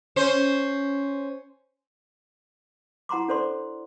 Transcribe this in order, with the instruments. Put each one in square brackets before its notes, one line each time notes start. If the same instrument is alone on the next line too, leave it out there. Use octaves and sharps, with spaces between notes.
[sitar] C#4 C5
[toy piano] E4 F#5 A#5 C6 D6
D4 A4 C5 D5 C6